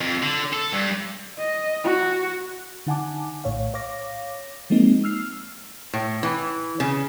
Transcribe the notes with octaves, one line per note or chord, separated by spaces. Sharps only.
F2
D3
A4
G2
D#5
F#4
D3 D#4 F#5 G#5 A5 D6
A#1 A2 C#5 F5
C#5 F5 D6 A#6
F3 G#3 A#3 C4 D#4
E6 F6 C7
A2
E3
C#3